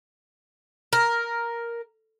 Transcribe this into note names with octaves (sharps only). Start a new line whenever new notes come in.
A#4